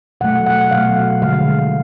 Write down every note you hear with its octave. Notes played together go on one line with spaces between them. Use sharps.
B2 F#3 A3 F#5
F#5
B2 F#3 A3 F5
D3 F3 G#3 F5